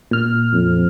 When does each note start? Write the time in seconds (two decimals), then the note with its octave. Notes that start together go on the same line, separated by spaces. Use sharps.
0.11 A#2 F6
0.53 F2